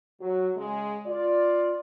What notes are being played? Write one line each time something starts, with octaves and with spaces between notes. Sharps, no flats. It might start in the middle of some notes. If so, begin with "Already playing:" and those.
F#3
C#3 G#3
F4 D5